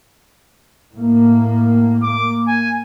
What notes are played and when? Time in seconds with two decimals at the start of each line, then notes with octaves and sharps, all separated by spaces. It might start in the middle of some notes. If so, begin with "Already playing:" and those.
0.92 A2 A#3
2.03 A#3 D6
2.47 G#5